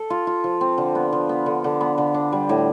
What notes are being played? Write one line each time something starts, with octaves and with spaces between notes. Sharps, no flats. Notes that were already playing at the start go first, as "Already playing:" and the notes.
Already playing: A4
F4
F4
F3
C4
D3
B3
F3
B3
D3
D3
B3
D3
D4
G3
A2